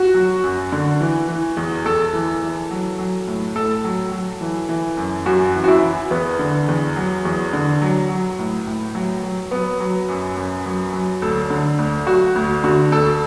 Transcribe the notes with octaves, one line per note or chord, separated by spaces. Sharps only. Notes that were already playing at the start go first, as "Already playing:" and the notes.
Already playing: F#4
F#3
F#2
D3
E3
E3
E2
E2 A4
E3
E3
F#3
F#3
A2
A2 A4
F#3
F#3
E3
E3
F#2
F#2 F#4
E3
F#4
E4
E3
E2 B3
D3
E2
F#3
E2
D3
F#3
F#3
A2
A2
F#3
F#3
F#3 B3
F#3
F#2
F#2
F#3
F#3
D2 A4
D3
D2
F#3 F#4
D2
D3 F#4
D2 A4